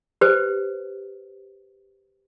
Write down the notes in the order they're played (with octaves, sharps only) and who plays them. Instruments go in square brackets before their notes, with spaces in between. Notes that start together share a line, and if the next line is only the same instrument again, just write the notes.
[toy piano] G4 B4 C5